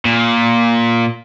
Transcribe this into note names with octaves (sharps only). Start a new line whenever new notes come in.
A#2